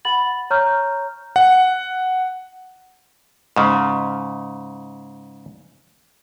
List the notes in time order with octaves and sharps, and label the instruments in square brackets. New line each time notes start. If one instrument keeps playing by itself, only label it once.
[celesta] F#5 B5 A6 F#7
C#5 A#5 C#6 F6 G6
[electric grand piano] F#5
[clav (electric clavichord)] G#2 C#3